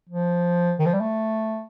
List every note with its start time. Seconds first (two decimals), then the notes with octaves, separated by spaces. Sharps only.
0.10 F3
0.79 D#3
0.86 F3
0.94 G3
1.01 A3